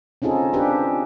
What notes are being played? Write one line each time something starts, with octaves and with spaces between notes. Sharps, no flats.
C4 C#4 D#4 F4 G#4 A4
C4 D4 F4 G4 G#4 B4